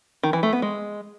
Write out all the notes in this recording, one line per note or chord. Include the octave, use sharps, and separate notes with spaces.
D#3
E3
A3
B3
G#3